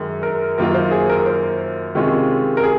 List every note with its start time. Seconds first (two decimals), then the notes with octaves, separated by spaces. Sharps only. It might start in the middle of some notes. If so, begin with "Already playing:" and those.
Already playing: F#2 D#3 G#3
0.23 A#4
0.58 F#2 D#3 A#3 F4 A#4
0.74 C5
0.91 G#4
1.09 A#4
1.26 C5
1.95 C3 D#3 G#3 C#4 F4
2.57 A#4
2.63 G#4